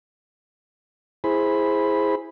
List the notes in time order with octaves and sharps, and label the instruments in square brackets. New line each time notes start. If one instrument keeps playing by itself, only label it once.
[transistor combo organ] E4 G#4 C5 B5